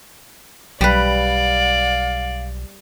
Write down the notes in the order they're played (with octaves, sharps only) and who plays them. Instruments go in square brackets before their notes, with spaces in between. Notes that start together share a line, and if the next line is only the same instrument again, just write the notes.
[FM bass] B1 [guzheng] G3 G4 B4 [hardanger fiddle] D5 [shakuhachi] F5